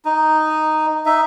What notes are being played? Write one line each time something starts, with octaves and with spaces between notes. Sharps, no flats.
D#4
D#4 E5